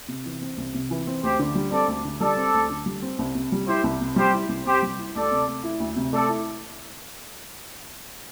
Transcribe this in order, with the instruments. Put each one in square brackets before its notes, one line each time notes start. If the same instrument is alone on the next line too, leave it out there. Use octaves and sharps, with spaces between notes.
[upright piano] C3
E3
C4
C2
C3
E3
C4
[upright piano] D2 [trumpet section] G4 C5
[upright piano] D3
G3
[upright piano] C4 [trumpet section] A4 D5
[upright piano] D2
D3
[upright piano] G3 [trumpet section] A4 D5
[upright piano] C4
D2
D3
G3
C4
C2
C3
G3
[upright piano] E4 [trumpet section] G4 C5
[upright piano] C2
C3
[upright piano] G3 [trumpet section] G4 C5
[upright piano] E4
C2
[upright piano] C3 [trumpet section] G4 C5
[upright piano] G3
E4
[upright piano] D2 [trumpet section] A4 D5
[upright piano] C3
A3
E4
D2
C3
[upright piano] A3 [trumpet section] A4 D5
[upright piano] E4